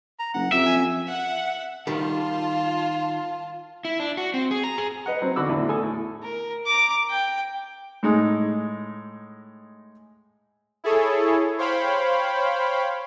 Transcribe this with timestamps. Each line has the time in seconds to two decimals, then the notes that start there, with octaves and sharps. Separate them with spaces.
0.20 A#5
0.34 F#1 F#5
0.52 F2 G4 E5
0.66 G#5
1.07 E5 F#5
1.87 D#3 G3 F4 A5
3.85 E4
4.00 D4
4.17 F#4
4.34 C4
4.51 G#4
4.64 A#5
4.78 G#4
5.06 B4 D#5 F#5
5.22 F#3 C4 F#4
5.36 E2 D3 F#4 B5 D6 E6
5.48 E2 A2 D3 E3
5.69 A4 G#5 D#6
5.83 A2
6.23 A#4
6.66 A#5 D6
7.10 G5
8.03 A2 G#3 D#4
10.84 E4 G#4 A4 C#5
11.58 C5 C#5 F5 G5 B5